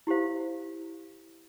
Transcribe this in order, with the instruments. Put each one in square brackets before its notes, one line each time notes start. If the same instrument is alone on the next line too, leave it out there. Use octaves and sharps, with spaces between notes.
[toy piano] E4 G4 C5 F5